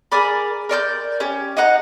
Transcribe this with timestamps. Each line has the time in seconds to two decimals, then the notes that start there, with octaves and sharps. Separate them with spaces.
0.12 G#4 A#4 D5 B5
0.69 A#4 D5 E5 G6
1.20 C#4 G4
1.57 D#4 D#5 F#5 A#5